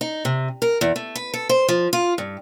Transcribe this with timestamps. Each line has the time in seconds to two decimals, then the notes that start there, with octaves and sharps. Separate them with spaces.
0.01 D#4
0.25 C3
0.62 A#4
0.81 E2
0.96 A3
1.16 B4
1.34 A4
1.49 C5
1.68 F3
1.93 F4
2.18 G2